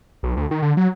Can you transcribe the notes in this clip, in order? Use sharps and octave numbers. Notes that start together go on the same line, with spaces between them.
B1
D2
D#3
D3
F#3